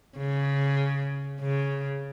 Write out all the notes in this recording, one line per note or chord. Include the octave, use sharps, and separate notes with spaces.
C#3
C#3